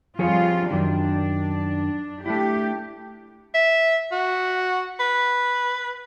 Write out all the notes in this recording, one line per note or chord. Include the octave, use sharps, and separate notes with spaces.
F2 F3 G3 F4 G#4 C#5
F#2 D#3 D4
A3 D4 E4 G4
E5
F#4
B4